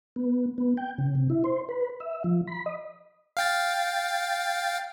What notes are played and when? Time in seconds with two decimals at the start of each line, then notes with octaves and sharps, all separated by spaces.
0.16 B3
0.58 B3
0.77 G5
0.98 C#3
1.15 C3
1.30 E4
1.44 C5
1.69 B4
2.00 E5
2.24 F3
2.47 B5
2.66 D#5
3.37 F5 G5 A6